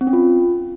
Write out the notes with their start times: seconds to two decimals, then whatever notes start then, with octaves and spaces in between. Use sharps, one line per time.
0.01 C4
0.07 C#4
0.13 F4